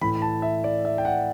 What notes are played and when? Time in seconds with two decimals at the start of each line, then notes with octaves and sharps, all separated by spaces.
0.01 A2 E3 B5
0.22 A5
0.42 E5
0.64 D5
0.85 E5
0.98 G5
1.05 F#5